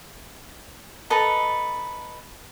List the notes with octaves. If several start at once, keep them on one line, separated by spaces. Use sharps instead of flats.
A4 B4 D#5 A#5